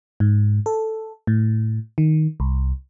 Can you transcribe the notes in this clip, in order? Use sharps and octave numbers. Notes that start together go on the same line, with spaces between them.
G#2
A4
A2
D#3
C2